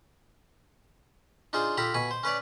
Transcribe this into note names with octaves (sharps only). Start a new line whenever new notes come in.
D4 D#4 F4 G#4 C5
F4 G4 A4 A#5 B5
B2 G#5 B5 C#6
C5
C#4 B4 C#5 D5